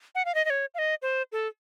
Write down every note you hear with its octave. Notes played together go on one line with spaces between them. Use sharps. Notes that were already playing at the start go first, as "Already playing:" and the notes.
F#5
F5
D#5
D#5
C#5
F5
D#5
C5
A4